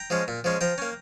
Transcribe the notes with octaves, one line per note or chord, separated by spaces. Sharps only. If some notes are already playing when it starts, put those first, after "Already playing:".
Already playing: G5 A#5
F3 G#3 C#4
A#2
F3 G#3 C#4
F3 G5 A#5
A#3 C#4